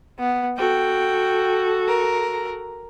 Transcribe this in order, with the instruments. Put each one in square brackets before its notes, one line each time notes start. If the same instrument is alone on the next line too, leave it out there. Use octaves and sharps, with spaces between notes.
[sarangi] B3
[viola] F#4 A4 [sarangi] G5
[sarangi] A#4